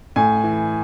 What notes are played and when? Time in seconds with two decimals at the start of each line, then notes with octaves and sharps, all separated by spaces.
0.16 A2 G#5
0.44 E3